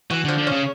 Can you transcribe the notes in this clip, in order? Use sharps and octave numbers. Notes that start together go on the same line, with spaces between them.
E3 F#4
D3 F3
D3
C#3 C#4